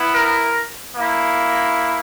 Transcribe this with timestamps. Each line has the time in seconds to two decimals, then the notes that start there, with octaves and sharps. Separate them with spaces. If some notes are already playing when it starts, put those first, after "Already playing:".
Already playing: B3 E4
0.13 A#4
0.94 A#3 E4